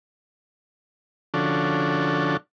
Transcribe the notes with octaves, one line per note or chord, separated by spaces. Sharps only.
D3 F3 C#4 D4 F#4 A4